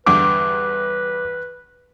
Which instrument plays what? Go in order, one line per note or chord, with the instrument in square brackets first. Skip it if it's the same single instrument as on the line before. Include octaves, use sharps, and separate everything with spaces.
[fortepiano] E2 G2 D3 [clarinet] B4 [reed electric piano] D6